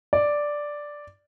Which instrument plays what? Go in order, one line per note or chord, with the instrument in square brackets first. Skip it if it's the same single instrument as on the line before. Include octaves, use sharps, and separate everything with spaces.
[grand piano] D5